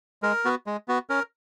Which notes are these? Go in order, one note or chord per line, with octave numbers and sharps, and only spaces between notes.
G#3 A#4
B3 F#4
G#3
B3 F#4
C#4 A#4